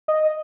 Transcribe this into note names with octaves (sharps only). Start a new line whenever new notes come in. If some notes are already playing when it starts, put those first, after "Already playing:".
D#5